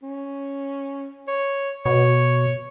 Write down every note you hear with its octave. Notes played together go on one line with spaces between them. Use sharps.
C#4
C#5
B2 C#5